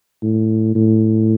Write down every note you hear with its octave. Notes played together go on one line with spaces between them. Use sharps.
A2
A2